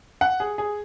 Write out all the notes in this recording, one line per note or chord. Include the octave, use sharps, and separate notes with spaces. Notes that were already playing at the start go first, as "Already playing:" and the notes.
F#5
G#4
G#4